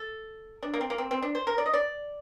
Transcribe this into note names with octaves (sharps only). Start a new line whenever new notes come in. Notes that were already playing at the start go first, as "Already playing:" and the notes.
Already playing: A4
D4
A#3
C4
A#3
C4
C4
D4
C5
A#4
D5
D#5
D5